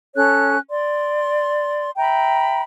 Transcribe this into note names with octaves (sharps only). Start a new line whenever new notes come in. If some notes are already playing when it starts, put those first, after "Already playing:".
C#4 A4 C#5 F#6
D5 C6
E5 G5 A#5 B5